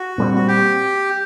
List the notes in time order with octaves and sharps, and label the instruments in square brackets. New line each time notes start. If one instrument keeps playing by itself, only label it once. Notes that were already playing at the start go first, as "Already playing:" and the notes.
Already playing: [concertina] F#4
[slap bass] A#2 G3 C4
[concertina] F#4
G4